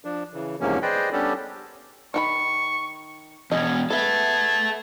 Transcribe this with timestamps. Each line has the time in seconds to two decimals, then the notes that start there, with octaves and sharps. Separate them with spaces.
0.05 F3 D4
0.34 C#3 E3
0.61 E2 G#2 C3 F3 A#3 C#4
0.82 G#4 B4 C5 D5 D#5 G5
1.12 G3 B3 C#4 D4 G4 A4
2.14 D#3 F#4 B5 C#6
3.52 E2 B2 C#4 F#4 D#5
3.90 B3 G#4 A4 E5